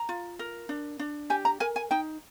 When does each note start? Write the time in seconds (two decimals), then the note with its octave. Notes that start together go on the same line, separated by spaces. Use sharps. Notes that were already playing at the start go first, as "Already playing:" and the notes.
Already playing: A#5
0.09 F4
0.39 A#4
0.69 D4
0.99 D4
1.30 G4 G#5
1.45 A#5
1.60 A#4 G#5
1.76 G#5
1.91 D#4 G5